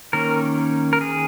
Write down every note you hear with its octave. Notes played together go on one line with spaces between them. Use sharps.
D#3 A#3 C#4 A#4
A#4
G#4